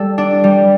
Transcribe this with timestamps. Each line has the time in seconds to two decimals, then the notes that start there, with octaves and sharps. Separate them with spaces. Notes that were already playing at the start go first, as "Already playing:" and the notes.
Already playing: G3 A4
0.18 D4
0.44 G3